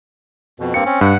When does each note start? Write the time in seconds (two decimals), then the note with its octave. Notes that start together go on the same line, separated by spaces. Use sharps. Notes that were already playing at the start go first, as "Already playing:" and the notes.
0.60 F2 B2
0.74 G2 A#3 C4 C#7
0.86 C4 C#4
1.01 G2 F#5